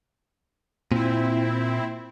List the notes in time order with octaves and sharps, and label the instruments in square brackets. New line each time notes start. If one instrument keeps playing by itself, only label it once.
[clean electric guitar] A#2 [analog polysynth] C4 E4